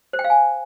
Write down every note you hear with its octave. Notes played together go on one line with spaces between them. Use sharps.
C5
G5
F5
G#5